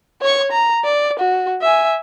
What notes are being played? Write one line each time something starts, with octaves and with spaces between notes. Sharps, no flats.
C#5 C#6
A#5
D5
F#4
E5 G#5